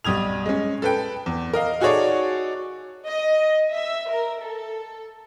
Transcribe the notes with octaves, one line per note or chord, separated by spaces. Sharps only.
B1 G3 D#6 G#6 F7
G#3 C#4
A4 B4 G5
E2
A#4 D#5 F5
D#4 F#4 G#4 A4 C#5 D5
D#5
E5
A#4
A4